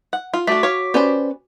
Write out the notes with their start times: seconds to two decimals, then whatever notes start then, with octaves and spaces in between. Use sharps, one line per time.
0.13 F#5
0.34 F4
0.47 A3 D4 F#4 D6 B6
0.63 C#5 F5
0.94 C#4 G4 B4 C5 D5